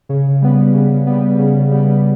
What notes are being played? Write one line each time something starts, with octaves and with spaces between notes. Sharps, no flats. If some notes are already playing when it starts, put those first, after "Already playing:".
C#3
G3 B3
C#3
G3 B3
C#3
G3 B3